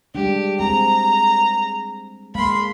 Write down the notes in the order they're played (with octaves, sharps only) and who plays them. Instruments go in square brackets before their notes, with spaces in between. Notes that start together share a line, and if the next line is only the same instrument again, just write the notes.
[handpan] G3 G#3 D4 [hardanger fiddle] G4
[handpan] G#3 C4 G#4 [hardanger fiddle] A#5
[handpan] G#3 A#3 F5 [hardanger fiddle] B5 C6